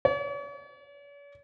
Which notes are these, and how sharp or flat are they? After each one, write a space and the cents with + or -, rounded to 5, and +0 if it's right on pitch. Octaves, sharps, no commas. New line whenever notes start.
C#5 +45